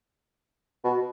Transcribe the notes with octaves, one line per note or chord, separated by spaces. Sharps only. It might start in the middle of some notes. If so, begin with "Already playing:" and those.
B2